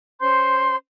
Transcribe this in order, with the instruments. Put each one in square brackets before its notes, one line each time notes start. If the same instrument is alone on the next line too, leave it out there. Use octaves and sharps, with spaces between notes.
[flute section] C#4 C5 C6 G6